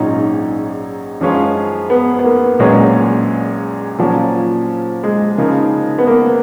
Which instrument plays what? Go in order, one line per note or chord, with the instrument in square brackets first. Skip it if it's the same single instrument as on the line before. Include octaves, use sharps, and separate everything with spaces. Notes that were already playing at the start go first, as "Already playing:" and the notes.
Already playing: [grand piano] A#1 G#2 F#3 C#4 F4 [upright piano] D#4
[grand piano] F#2 F3 G#3 C#4 F4
[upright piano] B3
B3
A#3
[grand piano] A#1 A#2 F#3 C#4 [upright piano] G#3
[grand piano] A#2 F#3 C#4 [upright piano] F3
[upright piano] G#3
[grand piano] C#3 F3 A#3 D#4 A#4
[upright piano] B3
A#3